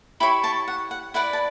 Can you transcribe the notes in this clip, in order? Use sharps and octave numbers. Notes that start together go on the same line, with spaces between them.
E4 G4 C#5 B5 D6
A5 C#6
F#5
F#5
E4 B4 D5 F#5
A5